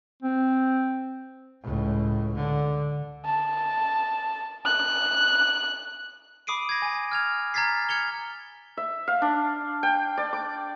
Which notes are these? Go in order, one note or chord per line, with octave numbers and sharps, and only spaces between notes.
C4
C#2 A2
D3
A5
F#6
B5 D6 D#6 C7 D7 D#7
G#6 A#6
G#5
F6 G#6 F7
A#5 F6 G#6 A6 B6 C7
F6 G#6 C#7 F7 G7
E5
F5
D4
G5
D5
D6